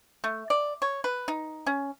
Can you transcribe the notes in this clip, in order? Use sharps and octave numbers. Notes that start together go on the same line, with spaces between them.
A3
D5
C#5
B4
D#4
C#4